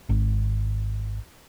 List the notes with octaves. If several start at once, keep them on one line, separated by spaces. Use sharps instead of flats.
G#1